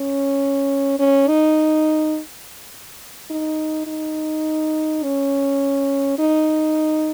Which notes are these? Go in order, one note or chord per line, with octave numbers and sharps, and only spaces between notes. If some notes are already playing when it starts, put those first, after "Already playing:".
Already playing: C#4
C#4
D#4
D#4
D#4
C#4
D#4